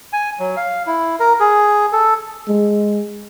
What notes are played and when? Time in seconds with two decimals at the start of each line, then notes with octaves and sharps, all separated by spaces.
0.13 G#5
0.40 F#3
0.57 F5
0.87 E4
1.20 A#4
1.40 G#4
1.93 A4
2.48 G#3